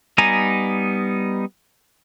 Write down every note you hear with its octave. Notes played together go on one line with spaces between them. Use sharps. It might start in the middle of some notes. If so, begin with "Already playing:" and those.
G3 B3 D#4 G#5 A#5